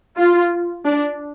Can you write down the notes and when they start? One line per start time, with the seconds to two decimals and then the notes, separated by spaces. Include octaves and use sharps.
0.17 F4
0.85 D4